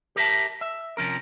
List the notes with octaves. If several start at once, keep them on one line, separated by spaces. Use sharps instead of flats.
G4 A#4 E5 A5
E5
C3 F3 C#4 A#4